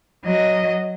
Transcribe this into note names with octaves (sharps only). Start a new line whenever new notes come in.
F#3 D#5